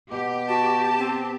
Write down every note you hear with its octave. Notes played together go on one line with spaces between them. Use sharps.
B2 G4
F#4 A5
C4